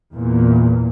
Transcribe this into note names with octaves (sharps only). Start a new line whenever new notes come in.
E2 A#2